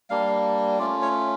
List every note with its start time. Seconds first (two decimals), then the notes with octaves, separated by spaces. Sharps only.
0.10 G3 A#3 D4 F5
0.79 A3 C#4 F4 D5
1.02 C#5